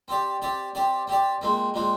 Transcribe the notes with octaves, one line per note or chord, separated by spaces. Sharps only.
C4 G4 D5
C4 G4 D5
C4 G4 D5
C4 G4 D5
A#2 G#3 C4
A#2 G#3 C4